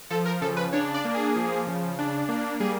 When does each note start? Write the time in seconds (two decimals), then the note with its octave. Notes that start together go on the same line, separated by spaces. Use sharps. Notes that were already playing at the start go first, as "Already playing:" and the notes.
0.10 F3 A4
0.25 A#4
0.41 C#3 A4
0.57 B4
0.73 D4 C#5
0.94 D5
1.05 A#3
1.14 G#4
1.36 F3
1.67 C#3
1.98 D4
2.29 A#3
2.60 G3 G#4